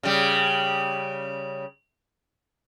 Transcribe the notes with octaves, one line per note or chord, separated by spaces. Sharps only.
C#3 G3